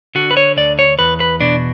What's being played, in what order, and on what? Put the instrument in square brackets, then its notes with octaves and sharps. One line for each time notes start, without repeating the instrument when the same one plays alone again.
[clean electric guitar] D3 F#4
B4
C#5
D2 D5
C#5
E2 B4
B4
B2 D4